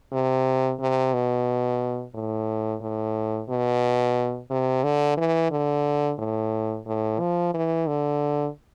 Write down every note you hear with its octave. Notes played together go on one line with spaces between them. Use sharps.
C3
C3
B2
A2
A2
B2
C3
D3
E3
D3
A2
A2
F3
E3
D3